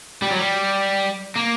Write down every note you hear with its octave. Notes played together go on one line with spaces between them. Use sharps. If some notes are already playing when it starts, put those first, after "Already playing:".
G3
F#3
G3
A#3